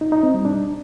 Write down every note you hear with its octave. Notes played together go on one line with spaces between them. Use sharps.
D#4
D#4
C4
G3
D4